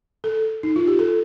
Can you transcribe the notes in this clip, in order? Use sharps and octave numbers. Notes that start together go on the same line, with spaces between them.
A4
D#4
F4
G4
A4